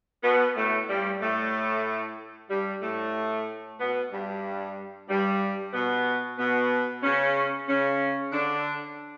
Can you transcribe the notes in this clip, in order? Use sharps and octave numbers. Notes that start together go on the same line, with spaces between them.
B2 B3
A2 A3
G2 G3
A2 A3
G2 G3
A2 A3
B2 B3
G2 G3
G2 G3
B2 B3
B2 B3
C#3 C#4
C#3 C#4
D3 D4